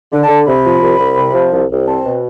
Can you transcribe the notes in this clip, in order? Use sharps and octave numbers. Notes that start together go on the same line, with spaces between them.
D3
A5
D3
C3 B5
F3
C2
C2
C3
F3
C2
C2
C4 A5
B2